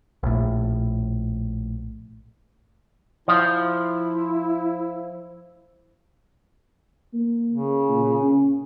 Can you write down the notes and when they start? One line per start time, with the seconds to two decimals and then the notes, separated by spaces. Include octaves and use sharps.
0.23 A#1 A2
3.28 F3 E4
7.13 A#3
7.51 C#3
7.89 A#2
8.22 C#4